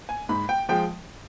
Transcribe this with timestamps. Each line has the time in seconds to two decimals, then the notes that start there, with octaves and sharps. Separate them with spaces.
0.09 G#5
0.29 G#2 B5
0.49 G5
0.69 F3 G#3 G5